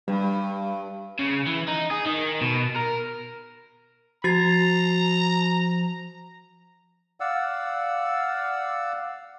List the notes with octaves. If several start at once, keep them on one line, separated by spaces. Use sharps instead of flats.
G2 G3
C#3
E3
D#4
G#4
D#3
B2
A#4
F3 F#4 A#5 A6 C7
D5 F5 F#5 E6